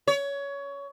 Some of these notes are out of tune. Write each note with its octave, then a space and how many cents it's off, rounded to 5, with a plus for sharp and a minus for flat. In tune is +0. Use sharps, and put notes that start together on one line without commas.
C#5 +20